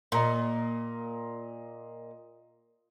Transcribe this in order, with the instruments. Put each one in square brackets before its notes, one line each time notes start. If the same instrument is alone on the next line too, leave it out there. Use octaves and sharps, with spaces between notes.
[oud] A#2 [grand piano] D#5 A#5 C6